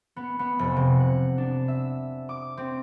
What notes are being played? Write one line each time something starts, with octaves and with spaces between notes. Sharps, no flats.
B3
B3
F1
C3
F#5
D4
E5
D6
C4